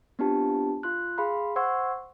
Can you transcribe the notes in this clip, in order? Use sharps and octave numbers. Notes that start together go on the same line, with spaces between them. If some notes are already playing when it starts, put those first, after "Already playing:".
B3 C4 D4 F4 G4 A5
F4 C6 F#6
G#4 F5 B5 C6
C5 F#5 C6 C#6 E6 G#6